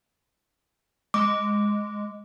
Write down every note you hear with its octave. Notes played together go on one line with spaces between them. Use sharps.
G#3 D6